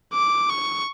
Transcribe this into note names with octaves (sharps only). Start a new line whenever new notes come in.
D6
C#6